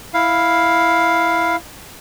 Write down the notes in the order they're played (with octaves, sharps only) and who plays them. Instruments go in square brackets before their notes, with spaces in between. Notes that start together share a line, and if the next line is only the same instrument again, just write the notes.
[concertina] E4 F5